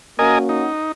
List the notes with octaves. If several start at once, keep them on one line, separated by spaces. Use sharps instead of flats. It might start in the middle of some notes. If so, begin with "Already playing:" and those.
A#3 C#4 F#4 A#4 D#5 G#5
D#4